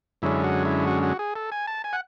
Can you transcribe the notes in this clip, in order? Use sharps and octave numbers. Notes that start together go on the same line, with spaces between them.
F#2 D3 G#3 C#4 E4
F#4
E4
F#4
F#4
G#4
A4
G#5
A5
G#5
F#5